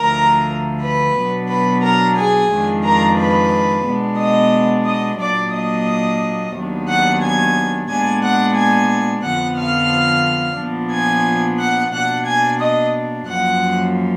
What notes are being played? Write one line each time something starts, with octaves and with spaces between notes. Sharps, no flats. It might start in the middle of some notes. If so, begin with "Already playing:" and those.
Already playing: D2 D3 F3 A#4 A#5
B4 B5
B2 F#3 B3 D4
B4 B5
A#4 A#5
G#4 G#5
F2 D#3 G#3 D4
A#4 A#5
B4 B5
B2 G#3 B3 D4
D#5 D#6
D#5 D#6
A#2 F#3 A#3 D4 D5 D6
D#5 D#6
D#2 D#3 F#3 B3 D4
F#5 F#6
G#5 G#6
A#2 G#3 B3 D4 G#5 G#6
F#5 F#6
G#5 G#6
F2 D3 F3 B3 F#5 F#6
F5 F6
A#2 F3 B3 D4
G#5 G#6
F#5 F#6
B2 A#3 D4 F#5 F#6
G#5 G#6
D#5 D#6
F#2 F3 A#3 F#5 F#6